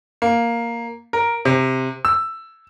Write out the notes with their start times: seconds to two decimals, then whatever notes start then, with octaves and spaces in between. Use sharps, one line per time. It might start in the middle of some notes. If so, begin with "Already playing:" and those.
0.22 A#3
1.13 A#4
1.45 C3
2.05 E6